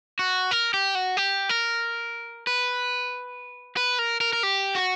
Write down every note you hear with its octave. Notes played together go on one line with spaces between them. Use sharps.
F#4
A#4
G4
F#4
G4
A#4
B4
B4
A#4
A#4
A#4
G4
F#4